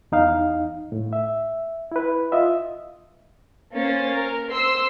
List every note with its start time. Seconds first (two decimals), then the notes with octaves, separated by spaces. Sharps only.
0.12 E2 D#4 F5
0.92 A2
1.13 E5
1.92 E4 B4
2.32 F4 D#5 E5
3.74 A#3 C#4 C5 A6
4.13 A#4
4.49 C5 C6 E6 C7